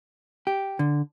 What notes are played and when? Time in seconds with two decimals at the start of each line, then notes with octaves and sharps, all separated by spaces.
0.47 G4
0.79 D3